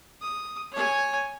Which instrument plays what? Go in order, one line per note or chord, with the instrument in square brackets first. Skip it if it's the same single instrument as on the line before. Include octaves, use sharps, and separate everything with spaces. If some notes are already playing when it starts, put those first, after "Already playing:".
[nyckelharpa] D#6
C#5 G#5